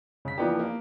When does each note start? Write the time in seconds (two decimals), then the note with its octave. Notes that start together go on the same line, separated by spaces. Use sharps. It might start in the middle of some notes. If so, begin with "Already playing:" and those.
0.25 C#3 B6
0.38 E3 F3 A#3 B3 D4 G4
0.59 A#3